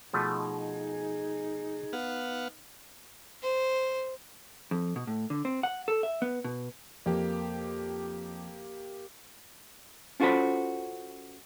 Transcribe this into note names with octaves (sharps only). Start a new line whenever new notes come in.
B2 F3 A3 D#4 G#4
B3 F5 F#5
C5
F2
B2
A2
D3
C4
F#5
A4
E5
B3
B2
F2 A#3 G4
C#4 F4 F#4 A4 C5 B5